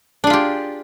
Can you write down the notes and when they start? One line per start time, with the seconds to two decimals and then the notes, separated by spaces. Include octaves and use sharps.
0.24 D4
0.27 G#4
0.30 F4
0.33 G4